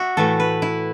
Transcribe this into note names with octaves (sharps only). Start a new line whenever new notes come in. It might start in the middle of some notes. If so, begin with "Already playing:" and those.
Already playing: F#4 E5
A2 E3 A3 A4
B4
E4